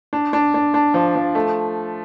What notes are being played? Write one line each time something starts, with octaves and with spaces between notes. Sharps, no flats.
D4
D4
D4
D4
F3
F3
A3